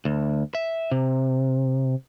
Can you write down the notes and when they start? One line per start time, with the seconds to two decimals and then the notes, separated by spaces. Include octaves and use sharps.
0.05 D2
0.55 E5
0.91 C3